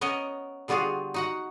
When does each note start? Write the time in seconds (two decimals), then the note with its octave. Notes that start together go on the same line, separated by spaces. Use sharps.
0.01 B3 C#4 A#4 C#5 D#5
0.68 D3 G3 B3 F4 F#4 G#4
1.14 D#4 F#4 F#5